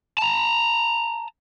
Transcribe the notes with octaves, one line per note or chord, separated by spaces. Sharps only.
A5 A#5